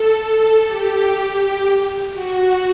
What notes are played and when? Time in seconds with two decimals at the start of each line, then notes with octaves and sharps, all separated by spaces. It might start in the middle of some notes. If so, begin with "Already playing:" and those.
Already playing: A4
0.68 G4
2.13 F#4